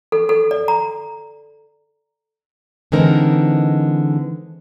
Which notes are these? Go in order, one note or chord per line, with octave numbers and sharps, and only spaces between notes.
A4
A4
D5
A#5
D3 E3 G#3 C4 D#4 A#4